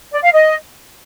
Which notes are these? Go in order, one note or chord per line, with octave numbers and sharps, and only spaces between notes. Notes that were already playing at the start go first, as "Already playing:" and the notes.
D5
F5
D#5